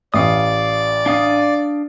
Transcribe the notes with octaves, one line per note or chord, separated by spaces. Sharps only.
A1 D5 F5 D#6
D4 F5 D#6